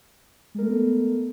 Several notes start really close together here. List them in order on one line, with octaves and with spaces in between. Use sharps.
G#3 A#4 A3 A4 B3